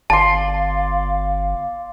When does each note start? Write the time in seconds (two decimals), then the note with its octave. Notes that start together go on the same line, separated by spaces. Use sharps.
0.10 G1 D5 F5 A5 C6